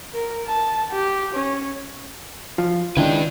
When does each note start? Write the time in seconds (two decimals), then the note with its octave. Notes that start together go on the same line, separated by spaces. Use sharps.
0.14 A#4
0.47 A5
0.92 G4
1.34 C#4
2.58 F3 F4
2.97 D3 D#3 G#3 C#4 D4 E4 B4 G5